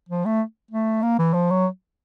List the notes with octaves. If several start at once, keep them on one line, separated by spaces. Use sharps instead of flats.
F3
A3
A3
A#3
E3
F3
F#3